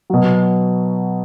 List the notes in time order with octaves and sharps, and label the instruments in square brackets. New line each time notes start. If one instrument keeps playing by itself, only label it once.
[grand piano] B2 F#3